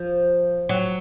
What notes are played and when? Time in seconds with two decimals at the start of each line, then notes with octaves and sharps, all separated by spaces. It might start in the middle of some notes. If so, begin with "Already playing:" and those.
Already playing: F3
0.69 F#3